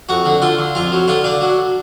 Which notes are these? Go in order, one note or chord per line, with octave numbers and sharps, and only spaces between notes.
F2 F#4
D3
D3 F4
D3
F2 F4
F#3
D3 F4
D3 D4
F#3